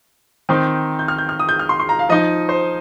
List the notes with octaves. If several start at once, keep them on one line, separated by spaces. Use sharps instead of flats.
D#3 C4 D#4
G6
F6
G6
F6
D#6
G6
F6
C6
C6
A#5
F5
F3 D#4 D#5
C5